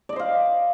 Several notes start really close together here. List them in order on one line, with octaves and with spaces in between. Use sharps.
D5 D#5 C5 F5